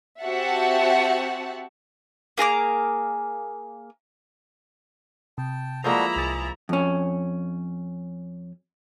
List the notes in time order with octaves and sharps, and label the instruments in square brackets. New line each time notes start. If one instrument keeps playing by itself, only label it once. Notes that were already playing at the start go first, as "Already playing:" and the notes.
[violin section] C4 F#4 G4 E5 F#5 A5
[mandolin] A#3 G#4 A#5 D6
[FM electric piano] C3 [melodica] G5 A5
[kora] F3 G#3 A#3 [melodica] G3 F#4 A4 [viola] E4 A#5
[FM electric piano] C2 A6 [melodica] G#4
[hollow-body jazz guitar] F2 C#4